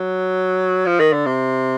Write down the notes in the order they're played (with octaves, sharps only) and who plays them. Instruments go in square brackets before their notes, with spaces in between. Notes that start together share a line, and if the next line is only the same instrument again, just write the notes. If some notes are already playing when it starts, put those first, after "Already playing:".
Already playing: [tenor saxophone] F#3
F3
D#3
D3
C3